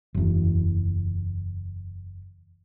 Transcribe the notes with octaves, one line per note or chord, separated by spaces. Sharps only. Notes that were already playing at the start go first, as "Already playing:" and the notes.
F#1 E2